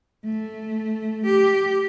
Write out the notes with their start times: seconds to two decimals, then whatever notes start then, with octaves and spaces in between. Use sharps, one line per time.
0.25 A3
1.26 G4